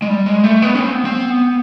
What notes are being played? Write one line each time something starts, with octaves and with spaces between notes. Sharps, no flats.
G#3
G3
G#3
A3
B3
C#4
C4
B3
C4
B3